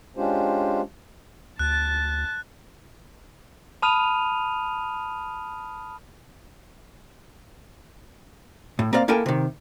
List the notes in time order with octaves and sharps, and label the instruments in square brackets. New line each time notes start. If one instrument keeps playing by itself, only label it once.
[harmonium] G#3 C#4 D4 F4 G4 C5
[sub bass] D2 [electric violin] A5 A6 [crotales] F#6
[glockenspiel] A5 B5 D#6 F6 D#7 F7
[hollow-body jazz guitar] A2
A#3 C4 D5 F5
A#3 E4 A4 A#4 G5 G#5
C3 D#3